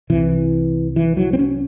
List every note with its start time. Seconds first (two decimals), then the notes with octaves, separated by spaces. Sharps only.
0.10 C2 C3 E3
0.96 E3
1.17 F#3
1.33 C4
1.39 C#4